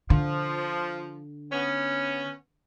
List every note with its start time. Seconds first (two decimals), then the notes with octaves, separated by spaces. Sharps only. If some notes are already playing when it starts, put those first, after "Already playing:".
0.10 D3 F3
1.52 B3 C#4